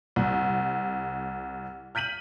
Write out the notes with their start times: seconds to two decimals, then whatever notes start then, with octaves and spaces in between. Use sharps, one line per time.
0.16 C2
1.95 F6 G6 B6 D#7 F#7